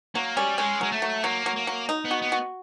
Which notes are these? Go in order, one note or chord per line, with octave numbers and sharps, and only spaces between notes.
F#3 A#3
G3 C#4
G#3 C#4
F#3 G#3
A3
F#3
F#3 A#3
F#3
A#3
F#3
D#4
B3
F#4
B3
F#4